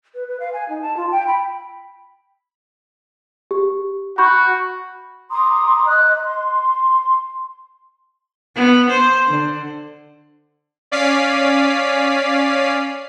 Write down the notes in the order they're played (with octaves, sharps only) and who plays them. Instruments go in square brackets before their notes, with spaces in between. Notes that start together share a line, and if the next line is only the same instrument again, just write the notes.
[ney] B4
B4
F5
G#5
D#4
A5
F4
G5
B5
[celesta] G4
[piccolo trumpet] F#4 [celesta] B5 C#6 G6
[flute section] A#5 C6 D6 D#6
D#5 F#6
C6
[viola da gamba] B3
C5
D3
[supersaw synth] C#4 D5 F5 B6 C7 D#7